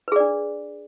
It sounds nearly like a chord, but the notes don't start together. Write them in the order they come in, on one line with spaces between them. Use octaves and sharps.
B4 G#4 D5 D4